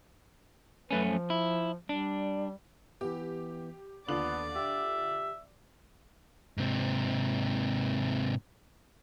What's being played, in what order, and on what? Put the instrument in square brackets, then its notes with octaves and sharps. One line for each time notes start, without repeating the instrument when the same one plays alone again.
[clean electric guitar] F#2 A3 C#4 [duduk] B4
[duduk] F3
[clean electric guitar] E4
[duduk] G3 [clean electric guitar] D4
[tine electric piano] E3 B3 [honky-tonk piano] G4
[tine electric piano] D#2 D4 D6 [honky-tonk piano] D3 F4 F#7 [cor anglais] B3 [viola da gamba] D5
[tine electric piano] G4 [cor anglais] E5
[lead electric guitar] G#2 C3